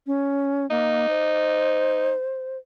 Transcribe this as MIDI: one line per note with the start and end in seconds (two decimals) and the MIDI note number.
0.07 0.69 61
0.70 1.07 58
0.70 2.11 63
1.09 2.57 72